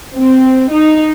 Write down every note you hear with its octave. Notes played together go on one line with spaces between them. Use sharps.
C4
D#4